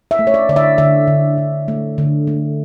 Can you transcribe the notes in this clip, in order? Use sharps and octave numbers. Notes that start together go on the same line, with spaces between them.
E5
A3
C#5
D5
D3 D5
E5
D3 E5
D3
D3
A3
D3
A3